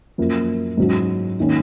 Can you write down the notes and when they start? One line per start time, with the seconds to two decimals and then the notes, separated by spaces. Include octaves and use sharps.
0.18 F#2 F3 A#3
0.77 G#2 F#3 C#4
1.40 D#3 A#3 C#4